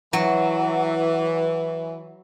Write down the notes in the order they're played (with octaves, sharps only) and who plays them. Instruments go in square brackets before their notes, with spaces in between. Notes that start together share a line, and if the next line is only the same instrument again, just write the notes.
[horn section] E3 [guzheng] F#3